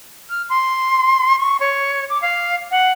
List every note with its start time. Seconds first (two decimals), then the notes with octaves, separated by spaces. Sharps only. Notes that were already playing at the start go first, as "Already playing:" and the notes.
0.29 F6
0.49 C6
1.39 C#6
1.60 C#5
2.09 D6
2.22 F5
2.71 F#5